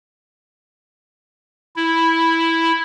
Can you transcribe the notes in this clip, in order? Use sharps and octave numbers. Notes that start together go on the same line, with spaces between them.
E4